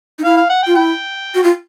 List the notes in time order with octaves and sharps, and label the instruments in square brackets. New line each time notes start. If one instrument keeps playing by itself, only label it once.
[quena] D#4
[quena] E4 [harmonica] F5
[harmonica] F5
F#5
G5
[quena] F4
[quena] E4 [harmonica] G5
[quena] F#4
F4